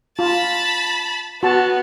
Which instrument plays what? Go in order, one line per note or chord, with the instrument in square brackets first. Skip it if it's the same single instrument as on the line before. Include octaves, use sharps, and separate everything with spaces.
[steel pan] F4 [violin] A5 B5
[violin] B3 [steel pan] F#4 A5